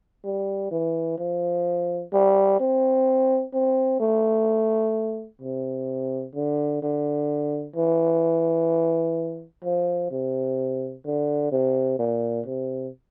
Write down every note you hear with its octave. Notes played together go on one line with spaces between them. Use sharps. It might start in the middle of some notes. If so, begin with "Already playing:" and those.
G3
E3
F3
G3
C4
C4
A3
C3
D3
D3
E3
F3
C3
D3
C3
A#2
C3